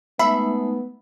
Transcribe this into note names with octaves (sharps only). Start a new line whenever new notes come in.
G#3 A3 B3 D#4 E5 B5